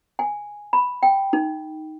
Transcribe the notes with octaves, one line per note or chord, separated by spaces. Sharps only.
G#5
B5
G5
D#4